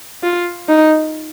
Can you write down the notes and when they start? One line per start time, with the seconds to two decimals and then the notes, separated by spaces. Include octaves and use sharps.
0.23 F4
0.68 D#4